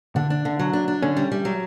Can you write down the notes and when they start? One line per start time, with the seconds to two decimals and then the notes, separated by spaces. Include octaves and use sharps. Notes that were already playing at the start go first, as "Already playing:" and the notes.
0.16 D3 D4
0.30 D4
0.45 D3
0.59 F#3
0.73 D4
0.88 D4
1.02 D3 C#4
1.17 G3
1.32 G3
1.45 F#3